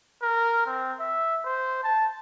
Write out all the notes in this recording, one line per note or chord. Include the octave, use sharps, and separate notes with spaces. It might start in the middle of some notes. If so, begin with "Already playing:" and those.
A#4
C4
E5
C5
A5